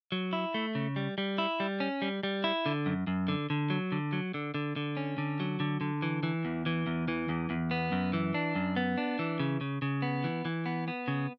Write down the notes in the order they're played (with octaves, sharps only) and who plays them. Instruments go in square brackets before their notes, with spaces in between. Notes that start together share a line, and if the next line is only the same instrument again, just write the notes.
[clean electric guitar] F#3
E4
A3
C#3
G3
G3
E4
G3
C#4
G3
G3
E4
D3
F#2
F#2
D3
D3
F#3
D3
F#3
D3
D3
D3
C#4
D3
F#3
D3
D3
E3
E3
E2
E3
E2
E3
E2
E2
B3
F#2
E3
D4
F#2
B3
D4
E3
C#3
C#3
C#3
B3
E3
E3
B3
B3
C#3